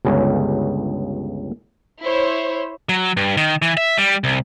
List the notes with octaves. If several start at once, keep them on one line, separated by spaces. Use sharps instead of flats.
G1 C#2 C#3
E4 C5 C#5
F#3
G2
D#3
E3
E5
G3
C2